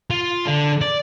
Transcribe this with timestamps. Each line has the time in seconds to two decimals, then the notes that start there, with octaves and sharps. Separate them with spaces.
0.10 F4
0.46 D3
0.81 D5